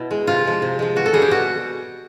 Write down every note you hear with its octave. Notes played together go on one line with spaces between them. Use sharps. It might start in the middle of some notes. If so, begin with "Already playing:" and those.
Already playing: B2 E4
G#3
C3 F4
F3 G#3
C3
F3 G#3
B2 F#4
A4
G3 G#4
G4
B2 F#4